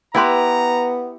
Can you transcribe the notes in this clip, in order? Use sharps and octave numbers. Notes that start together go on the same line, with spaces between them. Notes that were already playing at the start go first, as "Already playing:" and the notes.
B3 E4 G4 B4 E5 A#5 C6